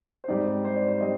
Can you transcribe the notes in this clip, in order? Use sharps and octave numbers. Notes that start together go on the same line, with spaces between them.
C5
G#2 G3 C4 D#4 D5
C5
D5
C5
G3 C4 D#5